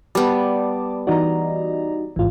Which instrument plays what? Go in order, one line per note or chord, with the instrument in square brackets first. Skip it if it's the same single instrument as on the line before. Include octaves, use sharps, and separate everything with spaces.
[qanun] G3 B3 [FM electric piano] D5 [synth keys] A5 D6
[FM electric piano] E3 D#4 F#4 [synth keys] D5 D#5 A#5
[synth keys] A1 D#2 G#2 [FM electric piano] E3 F4